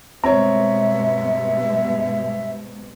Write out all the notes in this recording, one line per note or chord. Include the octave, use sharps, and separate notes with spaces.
G2 B2 G#3 C4 C#5 E5 A#5